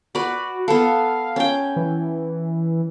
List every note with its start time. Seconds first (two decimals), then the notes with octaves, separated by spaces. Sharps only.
0.15 F#4 B4 D5
0.68 B3 A4 F5
1.36 C#4 G5
1.76 E3